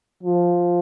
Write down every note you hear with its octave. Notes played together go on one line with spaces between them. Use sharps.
F3